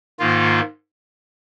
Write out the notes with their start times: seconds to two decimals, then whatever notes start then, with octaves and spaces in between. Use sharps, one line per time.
0.19 G#2 D#3 A#3 F4